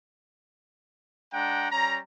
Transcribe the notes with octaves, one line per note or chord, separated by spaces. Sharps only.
G#3 D4 F#5 G5 A#5
G3 C#4 A#5